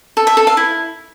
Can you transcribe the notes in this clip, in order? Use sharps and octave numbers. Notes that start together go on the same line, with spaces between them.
A4
E5
A4
F5
E4